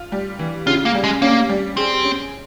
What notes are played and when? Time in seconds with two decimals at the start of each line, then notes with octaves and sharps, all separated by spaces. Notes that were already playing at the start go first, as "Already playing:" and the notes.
Already playing: F4
0.12 G3
0.39 E3
0.67 C#3 F4
0.85 A#3
0.95 G3
1.04 G#3
1.22 A#3 C#4
1.49 G3
1.77 C4 G#4
2.04 C#4